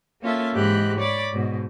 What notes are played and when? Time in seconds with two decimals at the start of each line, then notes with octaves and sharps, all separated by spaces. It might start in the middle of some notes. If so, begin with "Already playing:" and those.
0.21 A#3 C#4 F4 A4 E5
0.55 G#2 E3 G#3 G4 B5 F#6
0.99 C#5 D5 B5 D6 A6
1.33 G#2 B2